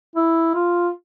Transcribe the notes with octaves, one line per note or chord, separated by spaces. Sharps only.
E4
F4